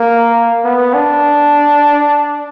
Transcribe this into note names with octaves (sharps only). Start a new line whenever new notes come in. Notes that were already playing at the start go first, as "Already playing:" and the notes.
Already playing: A#3
B3
D4